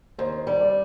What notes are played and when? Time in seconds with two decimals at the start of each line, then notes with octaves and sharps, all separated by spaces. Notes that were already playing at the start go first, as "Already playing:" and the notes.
0.18 D#2 C5
0.47 G3
0.53 C5
0.61 D5